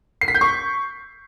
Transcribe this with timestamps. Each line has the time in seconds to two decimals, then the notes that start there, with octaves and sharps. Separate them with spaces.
0.21 C7
0.28 B6
0.35 G6
0.41 C#6